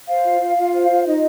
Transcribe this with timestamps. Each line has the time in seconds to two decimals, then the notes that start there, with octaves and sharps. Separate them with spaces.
0.09 C5 F5
0.25 F4
0.41 F4
0.58 F4
0.74 C5
0.90 F4
1.06 D#4 D#5